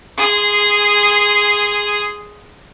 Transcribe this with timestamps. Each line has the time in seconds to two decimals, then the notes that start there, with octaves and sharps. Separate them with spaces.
0.18 G#4 C6